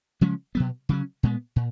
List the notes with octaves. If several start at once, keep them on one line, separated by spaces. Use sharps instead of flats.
C#3 F3 G#3 C#4
B2 F#3 B3
C#3 F#3 C#4
A#2 G#3 B3
A#2